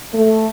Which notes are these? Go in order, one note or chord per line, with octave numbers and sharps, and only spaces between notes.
A3